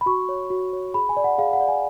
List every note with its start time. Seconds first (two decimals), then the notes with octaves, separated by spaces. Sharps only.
0.01 B5
0.06 F#4 C#6
0.29 C#5
0.50 F#4
0.73 C#5
0.94 G#4 B5
1.09 G#5
1.17 D5
1.24 F#5
1.38 G#4 F5
1.53 F#5
1.60 D5
1.68 G#5